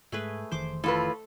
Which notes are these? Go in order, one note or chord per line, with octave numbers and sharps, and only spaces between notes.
G#2 A3 G#4 B4
F1 D#3 E3 C5 D6
A2 F4 A4 B4